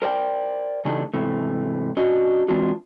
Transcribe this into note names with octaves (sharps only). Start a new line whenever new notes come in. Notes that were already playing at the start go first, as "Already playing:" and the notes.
A#4 C5 D5 G5
C#3 E3 A3 D4 D#4 G4
G#2 C3 E3 A3
C#4 D4 F#4 D#5
E3 G#3 C4 D4 F4 F#4